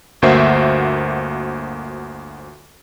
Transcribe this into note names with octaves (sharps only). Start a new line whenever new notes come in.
G1 D2 A#3 F#4 C5 E5